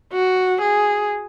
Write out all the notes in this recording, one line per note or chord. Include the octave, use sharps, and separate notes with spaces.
F#4
G#4